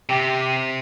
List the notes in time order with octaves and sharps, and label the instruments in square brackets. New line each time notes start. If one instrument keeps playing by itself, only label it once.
[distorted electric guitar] C3 [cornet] G4